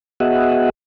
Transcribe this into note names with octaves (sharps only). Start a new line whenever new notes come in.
B3 F#4 G#4 D#5 E5 F#5